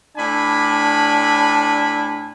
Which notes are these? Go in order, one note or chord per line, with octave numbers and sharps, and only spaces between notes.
A2 D4 G#5 B5